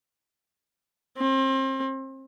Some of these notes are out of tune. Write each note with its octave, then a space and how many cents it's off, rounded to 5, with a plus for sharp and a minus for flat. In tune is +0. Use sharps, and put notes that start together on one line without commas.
C4 +35